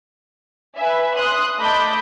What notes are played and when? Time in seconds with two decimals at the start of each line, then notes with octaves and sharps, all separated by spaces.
0.77 B4 E5 G#5
1.16 C6 D#6 F#6
1.59 A3 D#5 A5 B5 D6 G6